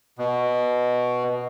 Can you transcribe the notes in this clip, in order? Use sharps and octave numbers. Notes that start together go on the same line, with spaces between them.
B2